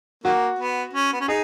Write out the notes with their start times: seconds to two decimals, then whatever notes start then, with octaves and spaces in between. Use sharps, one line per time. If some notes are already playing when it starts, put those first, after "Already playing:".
0.24 D#3 F#3 A#3 F#4
0.59 B3
0.94 C#4
1.13 B3
1.20 C#4
1.28 D#4 G#4